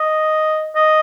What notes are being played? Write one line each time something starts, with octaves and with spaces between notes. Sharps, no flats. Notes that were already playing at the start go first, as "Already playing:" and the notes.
Already playing: D#5
D#5